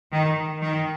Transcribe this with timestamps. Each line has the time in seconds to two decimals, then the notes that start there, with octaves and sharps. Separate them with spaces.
0.12 D#3
0.61 D#3